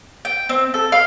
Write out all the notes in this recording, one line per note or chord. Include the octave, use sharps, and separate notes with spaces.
G5
C4
A4
F5